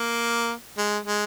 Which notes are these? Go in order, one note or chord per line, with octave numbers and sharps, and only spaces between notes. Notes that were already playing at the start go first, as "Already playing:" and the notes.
Already playing: A#3
G#3
G#3